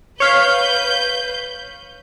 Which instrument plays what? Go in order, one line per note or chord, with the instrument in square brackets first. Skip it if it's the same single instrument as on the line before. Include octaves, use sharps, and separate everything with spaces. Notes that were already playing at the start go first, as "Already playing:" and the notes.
[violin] B4 G6 [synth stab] C#5 F5 B6